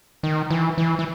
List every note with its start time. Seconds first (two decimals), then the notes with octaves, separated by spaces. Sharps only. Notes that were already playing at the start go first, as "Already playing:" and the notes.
0.23 D#3
0.50 E3
0.78 E3
0.99 E3